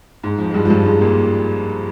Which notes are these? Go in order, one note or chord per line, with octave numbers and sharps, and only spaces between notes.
G#2
F2 F3
G#3
G2 G3
F3
G2 G3
G#2 G#3
A#1 A#2